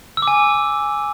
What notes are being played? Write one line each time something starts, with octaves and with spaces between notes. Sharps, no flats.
E6
D6
G#5